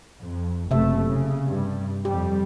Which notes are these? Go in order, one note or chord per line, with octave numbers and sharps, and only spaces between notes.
F2
F#1 C3 A3 E5
C#3
G2 G3
F2 G3 G4